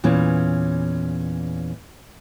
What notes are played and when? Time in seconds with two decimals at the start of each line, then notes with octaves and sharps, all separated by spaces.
0.04 E2 A#2 E3 C#4